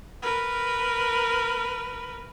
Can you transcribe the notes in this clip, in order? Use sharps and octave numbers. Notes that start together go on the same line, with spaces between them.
A#4 B4